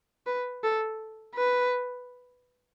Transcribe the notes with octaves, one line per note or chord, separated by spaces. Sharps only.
B4
A4
B4